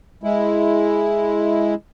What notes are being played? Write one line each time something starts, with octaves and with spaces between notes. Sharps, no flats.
G#3 E4